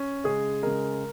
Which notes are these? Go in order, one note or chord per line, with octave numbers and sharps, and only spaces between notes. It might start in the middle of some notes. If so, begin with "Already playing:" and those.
Already playing: C#4
C#3 G#3 G#4
C#3 G#3 A#4